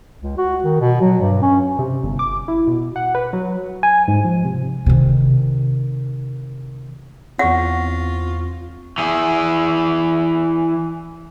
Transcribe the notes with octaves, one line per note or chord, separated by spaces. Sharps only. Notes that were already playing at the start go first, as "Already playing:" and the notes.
C#2
F#4
D#3
B2
F#3
G2
C#4
C3
G1
D6
E4
B2
F#5
B4
F#3
G#5
G#2
F3
C3
C3 D#3
E2 C4 F4 F#5 C#6 A#6
E3 G#4